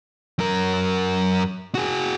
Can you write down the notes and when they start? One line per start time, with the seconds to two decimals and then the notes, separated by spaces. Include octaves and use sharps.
0.39 F#2 A#4
1.75 F#4 G#4